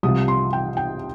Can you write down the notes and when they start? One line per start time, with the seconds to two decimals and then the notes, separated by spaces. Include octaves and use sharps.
0.03 C2 C3 F3 D#6
0.28 C6
0.53 G5
0.77 G5